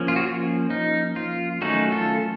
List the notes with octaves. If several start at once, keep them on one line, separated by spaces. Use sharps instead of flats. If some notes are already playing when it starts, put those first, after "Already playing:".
Already playing: F3 A#3 C#4
F4
F#4
F4
D#4
F4
D#3 F#3 A3 C#4 D#4 F#4
F4 A4